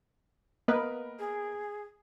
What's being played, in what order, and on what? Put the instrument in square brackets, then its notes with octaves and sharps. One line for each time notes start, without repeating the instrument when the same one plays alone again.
[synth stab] A#3 B3 B4 [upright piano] A#4 D#5
[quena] G#4